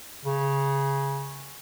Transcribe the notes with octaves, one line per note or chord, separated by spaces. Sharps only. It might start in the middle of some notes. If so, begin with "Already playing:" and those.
C#3